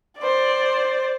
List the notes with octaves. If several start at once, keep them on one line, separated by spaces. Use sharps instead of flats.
C5 D5